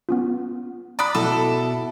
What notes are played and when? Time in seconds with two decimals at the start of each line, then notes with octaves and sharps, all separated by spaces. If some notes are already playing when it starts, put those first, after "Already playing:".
0.09 B3 C#4 F4
0.99 D5 A#5 B5 D#6 F#6
1.15 B2 E4 A4